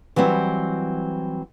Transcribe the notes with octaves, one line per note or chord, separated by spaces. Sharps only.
E3 F#3 G3 C4